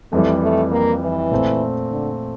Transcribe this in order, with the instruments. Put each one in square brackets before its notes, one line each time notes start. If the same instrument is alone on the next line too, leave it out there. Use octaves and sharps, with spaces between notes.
[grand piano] F2 E3 G3 [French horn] A3
[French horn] A3
A#3
E3
[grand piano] A#2 A3 C4
[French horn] D3